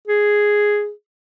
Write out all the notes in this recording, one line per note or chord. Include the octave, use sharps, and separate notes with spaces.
G#4